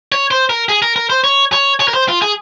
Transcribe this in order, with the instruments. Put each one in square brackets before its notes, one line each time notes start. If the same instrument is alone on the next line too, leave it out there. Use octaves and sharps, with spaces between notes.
[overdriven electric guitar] C#5
C5
A#4
G#4
A#4
A#4
C5
C#5
C#5
C#5
A#4
C5
F4
G#4